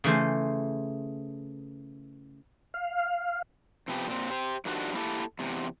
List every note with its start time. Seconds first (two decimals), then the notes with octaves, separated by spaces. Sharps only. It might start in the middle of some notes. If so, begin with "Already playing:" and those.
0.04 C#3 E3 A3 C5
2.74 F5
3.88 C3 F3 B3 G4
4.08 A#2 C4
4.31 G4 C5
4.65 G2 D#3 F3 G3 D4 F#4
4.95 A#3 E4 G4 A4
5.39 E2 C3